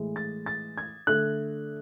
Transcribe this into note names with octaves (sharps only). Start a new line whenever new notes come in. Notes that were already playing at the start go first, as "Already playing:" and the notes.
Already playing: A2 E3 G#3
A6
A6
G#6
D3 A3 F#6